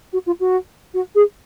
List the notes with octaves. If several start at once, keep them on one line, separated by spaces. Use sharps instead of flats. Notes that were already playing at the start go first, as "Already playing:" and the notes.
F#4
F4
F#4
F#4
G#4